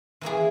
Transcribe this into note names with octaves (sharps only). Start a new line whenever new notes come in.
E3 A#3 E4 G#4